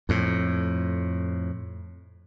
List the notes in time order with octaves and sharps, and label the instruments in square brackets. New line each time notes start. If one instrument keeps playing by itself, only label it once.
[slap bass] F2 A2